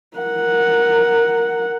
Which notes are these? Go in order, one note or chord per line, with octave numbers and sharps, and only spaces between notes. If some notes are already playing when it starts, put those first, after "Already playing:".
A#4 F#5